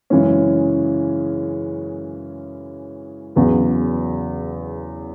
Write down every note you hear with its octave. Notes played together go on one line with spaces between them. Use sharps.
F#2 C#3 E3 G#3 C#4
E2 C#3 F#3 B3